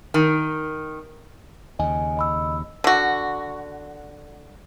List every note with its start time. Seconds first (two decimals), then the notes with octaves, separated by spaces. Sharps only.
0.14 D#3
1.79 D#2 C#3 D#5 G#5
2.17 D#5 B5 E6
2.84 D3 F#4